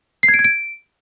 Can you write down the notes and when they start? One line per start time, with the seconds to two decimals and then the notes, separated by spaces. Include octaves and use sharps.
0.23 C7
0.28 G#6
0.34 D7
0.39 G#6
0.44 D7